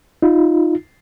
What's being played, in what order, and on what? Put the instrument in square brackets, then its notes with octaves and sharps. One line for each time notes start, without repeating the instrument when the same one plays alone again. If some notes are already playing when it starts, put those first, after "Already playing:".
[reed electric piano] D#4 F4